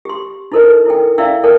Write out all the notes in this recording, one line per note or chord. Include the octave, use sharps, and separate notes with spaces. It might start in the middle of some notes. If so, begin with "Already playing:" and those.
G4 C6
D#4 E4 A4 A#4 C5 D#5
E4 A4 G5
E4 D5 E5 F5 G5 E6
A4 A#4 C#5 G5 A5